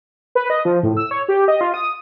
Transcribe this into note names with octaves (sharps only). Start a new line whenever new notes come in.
B4
D#5
F3
A2
E6
C#5
G4
D#5
F4
D#6